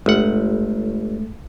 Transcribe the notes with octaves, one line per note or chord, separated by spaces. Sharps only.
G1 G#3 A3 F#5